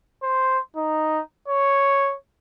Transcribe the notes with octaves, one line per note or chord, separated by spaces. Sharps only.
C5
D#4
C#5